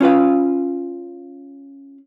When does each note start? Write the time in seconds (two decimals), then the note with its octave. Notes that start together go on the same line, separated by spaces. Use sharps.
0.01 C#4 F4 B4 F5